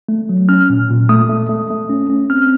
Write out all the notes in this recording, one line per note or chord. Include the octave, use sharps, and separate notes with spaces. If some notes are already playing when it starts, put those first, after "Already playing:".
A3
F#3
C#4 F6
A#2
A#2
A3 D#6
A3
A3
A3
C#4
C#4
C4 F6